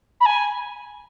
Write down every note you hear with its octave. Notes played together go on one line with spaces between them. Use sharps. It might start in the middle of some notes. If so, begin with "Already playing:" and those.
B5
G#5